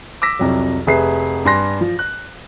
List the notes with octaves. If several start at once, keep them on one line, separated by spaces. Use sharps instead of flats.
D6 E6 A#6 B6
C2 F2 F#3
F1 G#4 B4 E5 C7
G2 G#5 C6 F#6 A#6
F3
F#6